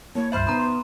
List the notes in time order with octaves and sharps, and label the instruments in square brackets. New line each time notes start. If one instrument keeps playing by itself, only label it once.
[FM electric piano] A#3 [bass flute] E4 [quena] C#5 [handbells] A5
[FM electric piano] C#2 G2 F#6 [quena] C5 [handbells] E5 B5 F6
[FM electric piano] B2 D#4 D#6 [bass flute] B3 [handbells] A#5 B5
[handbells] C6